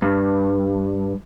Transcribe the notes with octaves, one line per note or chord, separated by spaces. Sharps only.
G2